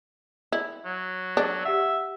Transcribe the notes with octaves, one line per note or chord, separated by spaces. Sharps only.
E4
F#3
D4
G4 E5 F#5